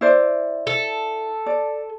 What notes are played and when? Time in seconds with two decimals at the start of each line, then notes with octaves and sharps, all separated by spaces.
0.01 E4 C5 D5
0.67 A4
1.46 D5